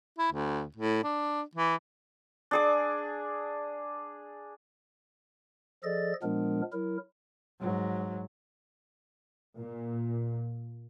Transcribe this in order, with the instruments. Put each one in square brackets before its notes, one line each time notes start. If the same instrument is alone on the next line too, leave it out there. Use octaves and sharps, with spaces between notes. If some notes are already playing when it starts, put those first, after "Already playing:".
[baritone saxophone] E4
D2
A2
D4
E3
[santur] D4 G#4 D6
[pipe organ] F3 G#4 A4 D5 D#5 A6
A#2 F3 G#3 B3 D4 A#4
F#3 E4 A#4
[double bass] G#2 F#3
[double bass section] A#2